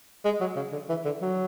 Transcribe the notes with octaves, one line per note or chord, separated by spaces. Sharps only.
G#3
F#3
C#3
D3
E3
D3
F#3